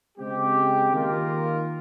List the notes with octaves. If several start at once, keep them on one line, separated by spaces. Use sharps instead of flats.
C#3 G#3 C4 G4
D#3 A#3 F4 A#4